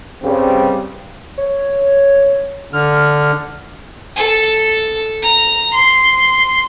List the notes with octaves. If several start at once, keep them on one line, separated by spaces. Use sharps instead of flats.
G2 C#3 G3 C4
C#5
D3 F6
A4
A#5
C6